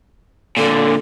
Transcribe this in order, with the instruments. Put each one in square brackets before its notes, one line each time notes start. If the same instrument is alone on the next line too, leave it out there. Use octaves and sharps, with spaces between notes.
[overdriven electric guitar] A#2 D3 [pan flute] A4